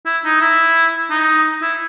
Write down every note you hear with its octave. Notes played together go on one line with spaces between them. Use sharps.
E4
D#4
E4
D#4
E4